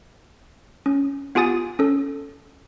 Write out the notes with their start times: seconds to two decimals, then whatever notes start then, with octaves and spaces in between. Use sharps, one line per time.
0.86 C#4
1.35 B3 F4 G4 G#5 D#6 A6
1.79 C#4 A4